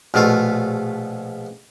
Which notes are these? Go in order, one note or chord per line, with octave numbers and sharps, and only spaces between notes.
A#1 B2 A3 F4